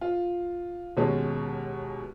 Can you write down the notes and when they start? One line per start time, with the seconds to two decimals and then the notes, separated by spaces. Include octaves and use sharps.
0.01 F4
0.97 D#2 B2 G#3 C#4 A5